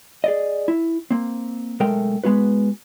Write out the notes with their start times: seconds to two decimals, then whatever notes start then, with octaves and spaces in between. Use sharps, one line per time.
0.24 G#4 D5 D#5
0.68 E4
1.11 A#3 C4
1.80 B1 G#3 A3 A#4 G5
2.24 G#3 B3 F#4 B4